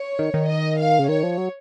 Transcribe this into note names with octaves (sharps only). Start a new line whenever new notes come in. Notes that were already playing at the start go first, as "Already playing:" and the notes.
Already playing: C#5
D#3
D#3
D#5
F5
C#3
D#3 C#5
F3
F#3